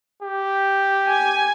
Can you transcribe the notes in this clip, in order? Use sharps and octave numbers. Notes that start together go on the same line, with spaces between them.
G4
G#5